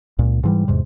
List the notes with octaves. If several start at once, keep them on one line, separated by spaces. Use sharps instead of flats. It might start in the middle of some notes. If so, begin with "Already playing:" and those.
C#2 A#2
G#2 E3 G3
E2 G#2 C3